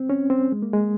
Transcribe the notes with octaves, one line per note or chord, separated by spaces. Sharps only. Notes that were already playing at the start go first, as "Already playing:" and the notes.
Already playing: C4
C#4
C4
G#3
A#3
G#3